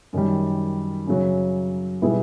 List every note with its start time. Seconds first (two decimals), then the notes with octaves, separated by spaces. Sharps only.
0.13 F#2 D#3 G3
1.07 F#2 C#3 F#3
2.01 B2 G3 B3 E4 G#4